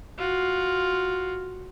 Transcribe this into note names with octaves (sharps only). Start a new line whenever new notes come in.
F4 F#4